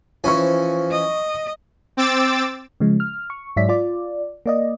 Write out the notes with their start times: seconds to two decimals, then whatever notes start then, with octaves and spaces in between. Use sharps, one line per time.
0.24 E3 F3 C#4 C5 G#5 C#6
0.91 D#5
1.97 C4 D6 E6 A6
2.80 C#3 F3 G#3
3.00 F6
3.30 C#6
3.56 G#2 F#3 C#5 D5 E5 B6
3.69 F4 D5
4.46 A#3 D5 D#5